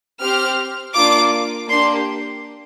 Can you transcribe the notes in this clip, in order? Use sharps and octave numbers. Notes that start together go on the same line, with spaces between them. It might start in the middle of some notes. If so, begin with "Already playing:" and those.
C4 G4 F6
A#3 D4 F4 D6
A#3 D4 G4 C6